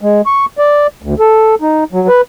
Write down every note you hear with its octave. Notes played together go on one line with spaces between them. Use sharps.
G#3
C#6
D5
D2
A4
D#4
F#3
B4